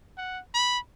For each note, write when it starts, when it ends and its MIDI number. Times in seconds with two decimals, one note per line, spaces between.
0.18 0.40 78
0.54 0.78 83